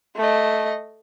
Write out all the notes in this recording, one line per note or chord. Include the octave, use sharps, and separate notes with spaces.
A3 D#5